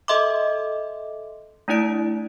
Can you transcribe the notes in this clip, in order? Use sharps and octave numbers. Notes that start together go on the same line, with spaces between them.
A4 D#5 E5 C6 D6
A3 D4 E4 D5 D7